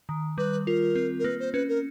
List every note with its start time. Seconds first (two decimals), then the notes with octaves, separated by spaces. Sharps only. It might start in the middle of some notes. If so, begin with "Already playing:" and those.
0.09 D#3
0.38 G3 B4
0.67 F4 A#4
0.96 C4
1.19 A#4
1.24 A#3 B4
1.40 C5
1.53 C#4 B4
1.69 A#4